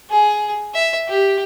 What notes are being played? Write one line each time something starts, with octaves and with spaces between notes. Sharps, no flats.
G#4
E5
G4